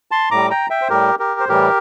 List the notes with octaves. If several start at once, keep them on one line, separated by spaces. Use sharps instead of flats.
A5 C6
A2 G3 A#5 D6
G5 A#5
E5 G5
C5
A2 G3 G4 A#4
G4 A#4
C5
A2 E3 G3 G4 A#4